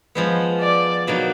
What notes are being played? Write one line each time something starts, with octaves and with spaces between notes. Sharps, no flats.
F3 G#3 B3
D5
B2 F#3 A#3 D#4